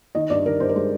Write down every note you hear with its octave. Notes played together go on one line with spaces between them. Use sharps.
D#3 D#5
G2 D5
D#3 A#4
G2 C5
A#4
G#3 C5